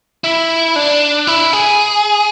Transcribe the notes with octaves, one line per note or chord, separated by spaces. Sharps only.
E4
D4
E4
G#4